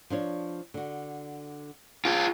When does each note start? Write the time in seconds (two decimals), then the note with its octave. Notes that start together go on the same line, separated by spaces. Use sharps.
0.10 F3 D4 C#5
0.74 D3 F#4
2.05 F4 G#4